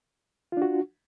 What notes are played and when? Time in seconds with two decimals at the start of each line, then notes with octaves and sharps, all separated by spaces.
0.52 F4
0.57 D4
0.62 F#4